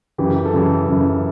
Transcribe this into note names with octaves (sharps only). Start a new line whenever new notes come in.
F#2 C#3 E3 G4
A4
F#2 C#3 E3 G#4
F#2 C#3 E3